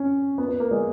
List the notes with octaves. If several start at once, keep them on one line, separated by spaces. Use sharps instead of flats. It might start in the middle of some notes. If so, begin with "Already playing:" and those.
Already playing: C#4
B3
B3
A#3
G#3